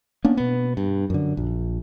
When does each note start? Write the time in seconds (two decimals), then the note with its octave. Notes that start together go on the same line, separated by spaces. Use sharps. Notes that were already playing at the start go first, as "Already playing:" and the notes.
0.25 A#3 B3 C#4 D4
0.37 B2 B3
0.77 G2
1.10 F#2 D3
1.37 A#1